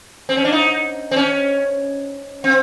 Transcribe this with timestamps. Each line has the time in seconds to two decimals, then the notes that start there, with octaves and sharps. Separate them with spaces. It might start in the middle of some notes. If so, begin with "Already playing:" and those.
0.29 C4
0.37 C#4
0.45 D4
0.53 D#4
1.11 C4
1.16 C#4
2.44 C4